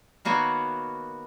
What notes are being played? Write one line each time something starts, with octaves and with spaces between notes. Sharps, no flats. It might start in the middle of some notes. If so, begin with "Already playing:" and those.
D#3 A#3 B3 F#4 C#5